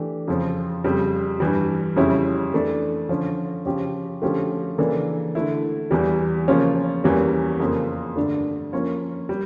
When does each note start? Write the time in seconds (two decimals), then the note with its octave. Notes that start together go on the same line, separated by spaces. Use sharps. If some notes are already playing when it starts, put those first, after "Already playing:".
Already playing: E3 A3 D4 G4
0.28 F2 C#3 F3
0.84 F2 C#3 G3
1.40 G2 E3 G3
1.96 F2 C#3 G3 C#4 E4
2.54 E3 A3 D4
3.09 D3 F3 C#4
3.65 C#3 F3 C#4 G4
4.22 D3 F3 A3 C#4 G4
4.78 C#3 E3 A#3 D4 A4
5.35 D3 A3 E4
5.91 E2 E3 G3
6.48 C#3 F3 A#3 C#4 F4
7.04 E2 E3 G3 A#3 C#4
7.60 F2 C#3 F3 A#3
8.16 G2 D3 A3 D4
8.73 F3 A#3 C#4 F4 C#5
9.29 G3